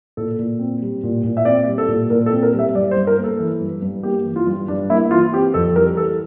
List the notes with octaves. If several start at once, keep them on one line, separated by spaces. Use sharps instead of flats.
A#2 A4
A#2
C4
G3
A#2
A#2
E5
C4 D5
G3
A4
A#2
A#2 A#4
A4
C4
A#4
G3
E5
G2 D5
C5
G2
A#4
A#3
A4
E3
G2
G2
A#3 G4
E3
F4
G2
G2 D4
A#3 E4
E3 F4
C4 G4
F2 A4
G3 A#4
E3 A4